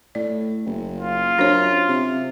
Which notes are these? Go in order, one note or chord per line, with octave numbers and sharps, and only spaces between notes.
A2 D5
F#1
F4
F#2 D4 C5 C#5
C3